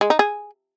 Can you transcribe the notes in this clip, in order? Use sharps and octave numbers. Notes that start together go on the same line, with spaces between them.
G#3
D#4
G#4